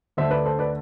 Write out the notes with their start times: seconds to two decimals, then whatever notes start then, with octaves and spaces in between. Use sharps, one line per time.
0.17 D2 D3 A3 C5 E5
0.31 B4 D5
0.46 A4 C5
0.59 B4 D5